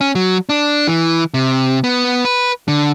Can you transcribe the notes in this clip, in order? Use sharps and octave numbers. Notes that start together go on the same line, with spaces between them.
C#4
F#3
D4
E3
C3
B3
B4
D3